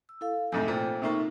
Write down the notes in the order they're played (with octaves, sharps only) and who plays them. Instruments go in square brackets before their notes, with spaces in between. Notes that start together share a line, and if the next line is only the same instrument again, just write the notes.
[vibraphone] E6
E4 A4 F5
[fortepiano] F2 G#2 C3 [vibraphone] A3 A4 G#5
[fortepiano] A#2 [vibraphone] C5 G5
[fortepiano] C3 A3 A#3 [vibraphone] D#4 C#6